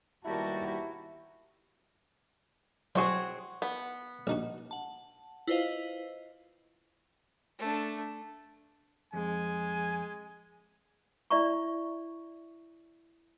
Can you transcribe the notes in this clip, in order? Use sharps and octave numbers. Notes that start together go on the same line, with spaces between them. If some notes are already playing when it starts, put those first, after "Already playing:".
D#2 B2 G3 E4 F#4 G4 A#4 A5
F#3 C4 F#4 G#4
B3
A#1 D#4 F#4
F#5 A5
E4 F4 B4 C5 D#5 F5
A3 D4
F2 G#3 G#5
E4 D5 E5 A#5 C#6